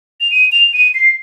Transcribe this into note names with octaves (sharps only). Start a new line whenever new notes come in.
F7
D#7
F7
D#7
C7